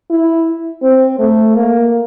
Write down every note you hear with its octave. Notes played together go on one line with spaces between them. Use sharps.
E4
C4
A3
A#3